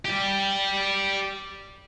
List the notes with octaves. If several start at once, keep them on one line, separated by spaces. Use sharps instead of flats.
G4 D5